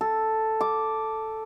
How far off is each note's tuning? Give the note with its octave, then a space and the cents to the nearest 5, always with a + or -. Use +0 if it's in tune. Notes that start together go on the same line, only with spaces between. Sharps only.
A4 +0
D6 +0